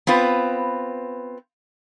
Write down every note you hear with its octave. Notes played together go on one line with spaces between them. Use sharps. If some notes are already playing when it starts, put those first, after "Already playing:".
B3 C4 F4 B4